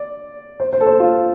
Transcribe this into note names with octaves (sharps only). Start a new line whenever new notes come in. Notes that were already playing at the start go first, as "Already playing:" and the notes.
Already playing: D5
C5
C5
A4
C5
F4